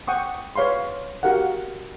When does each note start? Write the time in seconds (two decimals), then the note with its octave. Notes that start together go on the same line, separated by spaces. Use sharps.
0.07 F#5 G5 C#6 D#6
0.56 B4 C#5 F5 B5 C6
1.23 F#4 G4 A#4 F5 F#5